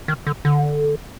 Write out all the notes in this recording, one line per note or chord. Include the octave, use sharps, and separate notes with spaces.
D#3
D3
D3